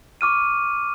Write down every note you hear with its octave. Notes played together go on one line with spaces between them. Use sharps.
C#6 D6 F6 D#7